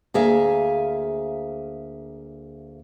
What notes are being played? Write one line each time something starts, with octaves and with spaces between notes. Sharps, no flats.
D2 A#3 G#4 E5 F5